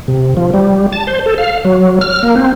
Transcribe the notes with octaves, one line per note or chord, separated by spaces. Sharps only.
C3
F3
G3
A5
C5
A4
F5
F#3
F6
A#3
C4